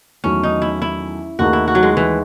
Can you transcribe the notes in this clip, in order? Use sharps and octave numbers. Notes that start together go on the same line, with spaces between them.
E2 D#3 F#3 A3 C#4
D#4
E4
E4
D#2 D#3 A3 D#4 F#4 G#4
E4
F#4
F#3
G#3
E3